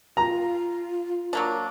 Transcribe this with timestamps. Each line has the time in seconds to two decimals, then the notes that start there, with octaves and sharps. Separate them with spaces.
0.17 F4 A#5
1.33 F#3 A#3 D4